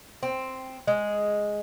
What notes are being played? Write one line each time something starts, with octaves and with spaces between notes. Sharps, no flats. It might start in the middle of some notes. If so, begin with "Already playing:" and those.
C4
G#3